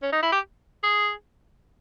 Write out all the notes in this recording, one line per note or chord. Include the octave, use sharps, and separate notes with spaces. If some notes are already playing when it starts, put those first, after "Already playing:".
C#4
D#4
E4
G4
G#4